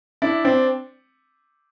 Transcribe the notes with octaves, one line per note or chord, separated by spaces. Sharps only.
D4 E4
C4 D4